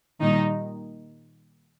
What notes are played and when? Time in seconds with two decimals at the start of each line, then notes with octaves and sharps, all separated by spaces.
0.21 A#2 D#3 G3 D#4